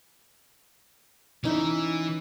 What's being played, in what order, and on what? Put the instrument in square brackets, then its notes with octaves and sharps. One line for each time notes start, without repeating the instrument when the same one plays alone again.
[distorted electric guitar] E3 [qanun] C#4 D#4 E4